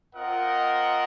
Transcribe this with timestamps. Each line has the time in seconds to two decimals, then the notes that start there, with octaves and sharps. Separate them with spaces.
0.14 C4 F4 A#4 D#5 F#5